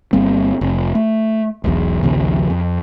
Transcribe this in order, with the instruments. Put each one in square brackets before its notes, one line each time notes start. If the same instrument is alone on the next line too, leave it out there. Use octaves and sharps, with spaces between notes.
[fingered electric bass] G1 G3 A#3 C4
F1
A3
E1 B1 E2
A#1 D#2 C#3 F3
F2